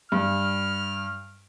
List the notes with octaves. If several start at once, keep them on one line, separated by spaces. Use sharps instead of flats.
G2 F6